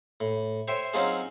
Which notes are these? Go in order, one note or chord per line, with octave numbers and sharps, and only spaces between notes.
A2
C5 C#5 E5 G5
F#3 C4 C#4 D#4 F4 G#4